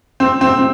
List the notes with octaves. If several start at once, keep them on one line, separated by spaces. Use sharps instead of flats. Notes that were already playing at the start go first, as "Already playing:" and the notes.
C4
C4
C4